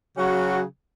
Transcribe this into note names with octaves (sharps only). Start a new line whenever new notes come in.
C#3 F#3 C#4 F#4